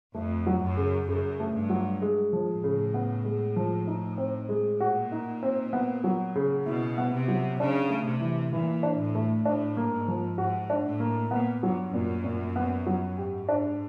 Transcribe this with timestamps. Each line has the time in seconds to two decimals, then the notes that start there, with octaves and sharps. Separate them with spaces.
0.15 F2 A3
0.47 F#3
0.62 F#2
0.77 C#3
1.08 F#2 C#3
1.40 A3
1.54 G2
1.70 F#3
2.02 G#3
2.33 F3
2.48 A2
2.64 C#3
2.94 B3
3.25 G#3
3.56 F3
3.87 D#4
4.18 C4
4.49 G#3
4.80 A#2 F#4
5.12 D#4
5.43 C4
5.73 B3
6.04 F#3
6.35 C#3
6.66 B2 E4
6.98 B3
7.13 C3
7.28 F#3
7.59 C#3 D4
7.90 A3
8.05 C3
8.21 E3
8.53 A#2 E3
8.83 D4
8.99 A2
9.15 A3
9.45 A2 D4
9.77 A#3
9.92 G#2
10.08 F3
10.38 G#2 F#4
10.70 D4
10.85 A2
11.00 A#3
11.31 A#2 B3
11.63 G2 F#3
11.94 F#2 A#2
12.24 A#2
12.56 B3
12.86 F#3
13.17 G#2 G4
13.49 D4